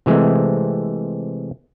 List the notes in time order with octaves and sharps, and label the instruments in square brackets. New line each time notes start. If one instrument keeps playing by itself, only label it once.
[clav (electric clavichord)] C3 E3 G#3 A3 C4